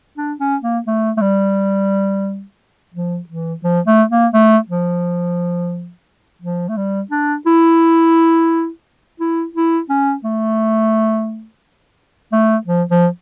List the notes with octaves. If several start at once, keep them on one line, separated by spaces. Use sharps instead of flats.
D4
C#4
A#3
A3
A3
G3
F3
E3
F3
A3
A#3
A3
F3
F3
A3
G3
D4
E4
E4
E4
C#4
A3
A3
F3
F3